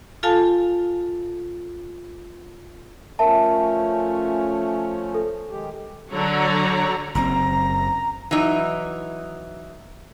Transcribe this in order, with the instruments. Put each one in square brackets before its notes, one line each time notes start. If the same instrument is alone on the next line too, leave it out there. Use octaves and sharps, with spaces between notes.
[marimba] F4 A4 F5 G#5 A5
[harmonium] F3 A3 C#4 [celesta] A#4 E5 A5
[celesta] A4
[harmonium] D#3 G#3 G4
[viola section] D3 F#3 C#5 D5 A#5
[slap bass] F#1 A#2 C4 [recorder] A#5
[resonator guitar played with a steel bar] E3 F#3 D#4